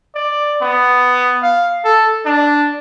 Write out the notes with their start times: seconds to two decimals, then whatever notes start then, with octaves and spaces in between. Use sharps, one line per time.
0.15 D5
0.62 B3
1.43 F5
1.85 A4
2.26 D4